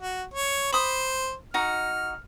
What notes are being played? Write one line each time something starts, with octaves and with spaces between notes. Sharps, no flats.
F#4
C#5
C5 B5 D#6
D#4 F#4 A#5 F6